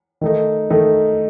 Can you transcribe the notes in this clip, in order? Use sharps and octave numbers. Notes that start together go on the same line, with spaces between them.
D#3 A3 D#4
D#3 A3 D#4